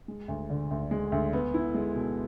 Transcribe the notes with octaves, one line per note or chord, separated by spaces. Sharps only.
G#3
D2
D3
D2
G#3
D2
B3
E4
G#3
B2